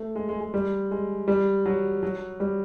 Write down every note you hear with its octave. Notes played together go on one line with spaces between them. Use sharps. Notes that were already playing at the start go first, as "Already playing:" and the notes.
Already playing: A3
G#3
G#3
G#3
G3
G#3
G3
F#3
F#3
G3